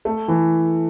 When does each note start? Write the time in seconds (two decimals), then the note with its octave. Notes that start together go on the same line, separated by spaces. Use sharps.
0.05 A3
0.28 E3